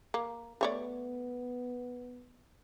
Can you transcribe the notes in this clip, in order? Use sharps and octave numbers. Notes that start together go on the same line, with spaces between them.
A#3
A3 B3 C#5 D5